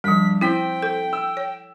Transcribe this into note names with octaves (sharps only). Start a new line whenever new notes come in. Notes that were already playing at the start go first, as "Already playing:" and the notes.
G2 F3 G3 B6
C4 E4 G5 B6
A4
E6
C#5